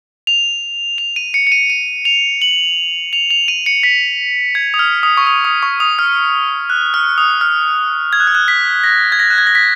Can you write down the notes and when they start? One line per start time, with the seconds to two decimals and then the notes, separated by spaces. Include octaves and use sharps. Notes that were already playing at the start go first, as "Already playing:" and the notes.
0.27 F7
0.98 F7
1.16 D#7
1.34 C#7
1.47 C#7
1.52 D#7
1.70 D#7
2.05 F7
2.42 F#7
3.13 F7
3.31 F7
3.48 D#7
3.66 C#7
3.83 B6
4.55 G#6
4.74 D#6
4.79 F6
5.03 D#6
5.17 C#6
5.27 D#6
5.45 D#6
5.63 C#6
5.80 D#6
5.99 F6
6.70 F#6
6.94 F6
7.18 D#6
7.41 F6
8.13 G#6
8.20 F#6
8.27 F6
8.35 F#6
8.48 B6
8.84 A#6
9.12 G#6
9.19 A#6
9.30 F#6
9.38 G#6
9.47 A#6
9.55 B6